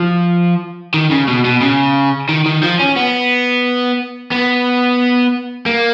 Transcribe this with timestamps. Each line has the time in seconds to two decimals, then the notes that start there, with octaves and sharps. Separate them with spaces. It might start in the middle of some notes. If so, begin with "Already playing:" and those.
Already playing: F3
0.94 D#3
1.11 C#3
1.28 B2
1.45 B2
1.61 C#3
2.29 D#3
2.46 D#3
2.63 F3
2.79 C#4
2.96 B3
4.32 B3
5.66 A#3